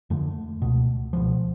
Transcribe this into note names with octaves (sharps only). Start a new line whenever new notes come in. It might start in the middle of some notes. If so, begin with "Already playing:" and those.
F2 D3 A3
C#2 B2
C#2 B2 F3